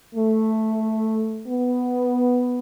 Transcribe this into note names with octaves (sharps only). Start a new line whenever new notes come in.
A3
B3